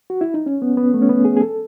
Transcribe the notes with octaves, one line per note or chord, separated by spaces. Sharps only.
F#4
E4
D#4
C#4
B3
B3
A3
C#4
B3
G#4
G#4
A4